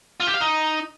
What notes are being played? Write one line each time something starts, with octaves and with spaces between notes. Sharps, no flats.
F4
G4
F5
D#4